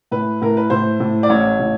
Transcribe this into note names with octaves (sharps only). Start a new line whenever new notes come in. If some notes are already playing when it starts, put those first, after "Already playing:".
A2 B4
A2 A#4
B4
A2 C5
A2
D5
A1 C#5
A2